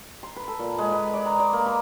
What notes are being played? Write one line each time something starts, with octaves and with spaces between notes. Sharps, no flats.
C6
B4
A4
A#2
G#3
B4
D5
A#5
D5
A#3
B5